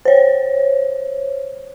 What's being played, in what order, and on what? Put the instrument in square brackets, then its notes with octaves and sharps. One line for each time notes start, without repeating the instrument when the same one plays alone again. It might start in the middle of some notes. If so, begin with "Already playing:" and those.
[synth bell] C5 C#5